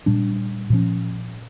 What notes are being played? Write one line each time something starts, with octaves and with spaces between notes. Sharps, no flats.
A#2 G3 D4
A#2 F3 C#4